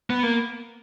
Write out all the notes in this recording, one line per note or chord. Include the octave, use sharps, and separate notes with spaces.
B3
A#3